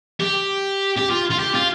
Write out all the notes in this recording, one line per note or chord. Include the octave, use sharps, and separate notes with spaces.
G4
G4
F4
F4
G4
F4